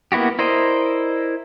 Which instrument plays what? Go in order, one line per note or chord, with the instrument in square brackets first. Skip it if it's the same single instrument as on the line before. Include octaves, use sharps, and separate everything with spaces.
[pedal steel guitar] A#3 B3 E4 F#4 G4
E4 A#4 C5 D5 D#5